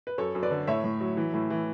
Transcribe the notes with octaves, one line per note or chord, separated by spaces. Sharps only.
B4
F#2 A4 C#5
F#2
B4 D5
D3
A2 C#5 E5
A2
F#3
E3
A2
E3